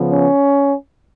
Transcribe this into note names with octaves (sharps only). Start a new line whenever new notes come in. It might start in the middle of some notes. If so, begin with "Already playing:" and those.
Already playing: C#3 F3 B3
C#4